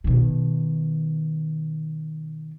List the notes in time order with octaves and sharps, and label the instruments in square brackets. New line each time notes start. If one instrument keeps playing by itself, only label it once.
[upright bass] B2 D#3